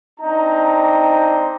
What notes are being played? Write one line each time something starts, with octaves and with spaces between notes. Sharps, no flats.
C4 D4 D#4 A#5